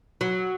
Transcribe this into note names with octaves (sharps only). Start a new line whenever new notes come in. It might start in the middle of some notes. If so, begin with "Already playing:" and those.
F#3